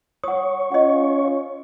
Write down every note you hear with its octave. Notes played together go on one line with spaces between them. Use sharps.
C#5 F#5 D#6
C#4 F4 D#5 F#5